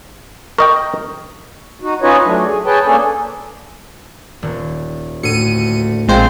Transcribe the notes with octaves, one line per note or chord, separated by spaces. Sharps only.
A#4 D#5 G5 C#6
D#4 F#4
C#4 D#4 F4 B4 C#5 D#5
F#3 A3 D4
G#4
G#4 B4 C#5 G5 A5
A#3 C#4 D4 G#4 A4
D#1
D2 A2 C#7 D#7
A#1 G#3 C4 F4 C5 G5 G6 G#6